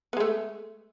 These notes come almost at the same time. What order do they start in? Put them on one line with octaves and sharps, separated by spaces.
B3 G#3 A3